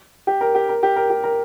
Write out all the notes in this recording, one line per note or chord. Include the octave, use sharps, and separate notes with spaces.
G4
A#4
G4
A#4
G4
A#4
G4
A#4